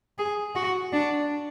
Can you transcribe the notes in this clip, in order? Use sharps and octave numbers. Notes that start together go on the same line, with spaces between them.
G#4
F#4
D4